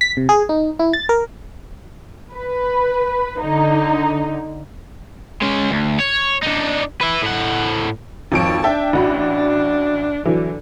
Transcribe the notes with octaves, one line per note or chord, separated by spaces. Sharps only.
B6
C3
G#4
D#4
E4
A6
A#4
B4
D3 D#4
G#3 C#4
D2
C#5
D4 D#4
B4 E5
A2 F#5
G#1 F2 C#5 A5 D7
D4 E5 G5 A5
A1 F#4 B5
D3 E3 F#3